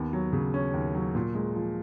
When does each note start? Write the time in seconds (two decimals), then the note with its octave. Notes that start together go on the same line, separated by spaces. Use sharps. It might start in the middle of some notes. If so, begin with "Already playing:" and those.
Already playing: D#2 B3
0.13 F#3
0.33 C#3
0.54 C#4
0.73 D#2
0.95 F#3
1.15 A#2
1.35 G#3
1.55 F3